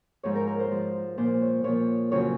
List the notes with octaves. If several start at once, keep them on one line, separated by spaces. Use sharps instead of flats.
G#2 F3 C#5
A#4
A#4
C5
G#2 F3
A#2 F3 C5
C#5
A#2 F3 C#5
F2 C#3 F#3 C#5